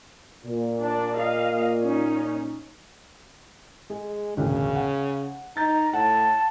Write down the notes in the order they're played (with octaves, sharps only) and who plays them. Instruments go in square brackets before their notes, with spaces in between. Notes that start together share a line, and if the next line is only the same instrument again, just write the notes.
[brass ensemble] A#2
[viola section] D4 D5
D#5 F5
C#4 D#4
[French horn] G#3 [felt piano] G#4
[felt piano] E1 A1 D2 [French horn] C#3
[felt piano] F#5
[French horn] D#4 [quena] A#5 [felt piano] G6 A6
[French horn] A2 [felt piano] F#5 [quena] A5